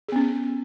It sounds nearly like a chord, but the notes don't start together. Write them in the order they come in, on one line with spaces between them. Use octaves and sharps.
G#4 B3 C#4